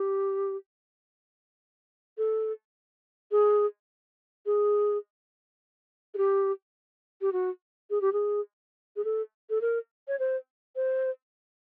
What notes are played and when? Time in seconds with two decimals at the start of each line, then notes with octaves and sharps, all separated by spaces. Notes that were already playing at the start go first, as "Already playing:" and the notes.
Already playing: G4
2.18 A4
3.31 G#4
4.46 G#4
6.14 G#4
6.17 G4
7.21 G4
7.33 F#4
7.90 G#4
8.01 G4
8.13 G#4
8.96 G#4
9.04 A4
9.50 A4
9.61 A#4
10.08 C#5
10.19 C5
10.76 C5